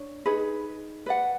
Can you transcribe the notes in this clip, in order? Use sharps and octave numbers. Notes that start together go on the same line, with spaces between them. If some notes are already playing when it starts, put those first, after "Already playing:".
Already playing: D4 C#5
D#4 G#4 B4
B4 D5 F#5